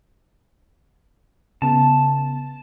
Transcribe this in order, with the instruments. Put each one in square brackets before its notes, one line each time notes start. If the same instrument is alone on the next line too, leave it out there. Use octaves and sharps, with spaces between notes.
[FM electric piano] C#3 B3 [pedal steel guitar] A5